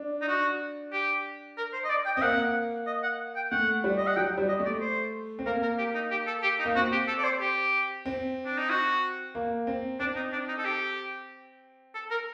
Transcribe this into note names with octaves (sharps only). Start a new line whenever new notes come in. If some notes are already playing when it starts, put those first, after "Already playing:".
Already playing: D4
D#4
F#4
G4
A#4
C5
D#5
D5
G5
C4 D#5
A#3 F#5
D#5
F#5
G5
A3 F#5
G3
D#5
F#5
F#3 G5
G3
D#5
A3
D5
C5
C4
A#3 A#4
A#4
G4
D#4
G4
A4
G4
D#4
A#3
C4 F#4
G4
A4
D5
C5
G4
C4
D4
D#4
F#4
A#3
C4
C4 D4
D#4
D4
D#4
A4
G4
A4
A#4